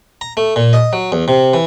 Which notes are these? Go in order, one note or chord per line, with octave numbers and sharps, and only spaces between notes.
A#5
A3
A#2
D#5
F#3
E2
C3
E3